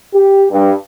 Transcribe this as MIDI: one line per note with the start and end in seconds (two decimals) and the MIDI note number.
0.14 0.45 67
0.51 0.72 43